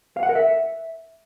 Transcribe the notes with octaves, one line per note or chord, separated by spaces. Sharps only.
F5
F#5
A#4
E5